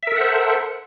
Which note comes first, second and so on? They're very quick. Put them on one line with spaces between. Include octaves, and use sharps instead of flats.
E5 A#4 A4 F#5 C5